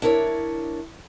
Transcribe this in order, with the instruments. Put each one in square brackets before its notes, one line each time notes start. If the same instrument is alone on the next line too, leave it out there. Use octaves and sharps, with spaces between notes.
[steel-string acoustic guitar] D4 E4 A#4 B4 C#5 D5